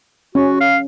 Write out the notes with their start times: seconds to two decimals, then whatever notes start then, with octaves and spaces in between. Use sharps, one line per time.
0.35 C#4 F#4
0.61 F5